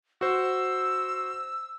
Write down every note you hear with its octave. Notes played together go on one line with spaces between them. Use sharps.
F#4 C5 E6